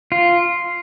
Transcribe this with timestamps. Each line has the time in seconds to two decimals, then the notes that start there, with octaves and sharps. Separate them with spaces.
0.12 F4